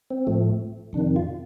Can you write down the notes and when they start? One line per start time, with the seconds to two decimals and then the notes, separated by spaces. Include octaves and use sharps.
0.10 C4
0.27 A2 F3 A3
0.93 F2 C3 D#3 D4
1.16 F4